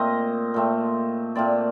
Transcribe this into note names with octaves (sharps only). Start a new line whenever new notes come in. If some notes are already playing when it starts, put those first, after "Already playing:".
Already playing: A#2 A3 C4 D#5
A#2 A3 C4
A#2 A3 C4 D5